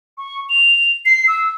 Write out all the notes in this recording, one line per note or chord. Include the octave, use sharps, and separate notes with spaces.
C#6
F7
C7
E6